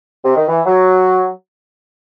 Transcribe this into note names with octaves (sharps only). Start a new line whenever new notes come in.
C3
D#3
E3
F#3